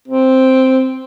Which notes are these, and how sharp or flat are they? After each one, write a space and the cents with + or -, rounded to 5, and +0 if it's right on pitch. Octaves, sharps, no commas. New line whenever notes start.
C4 +0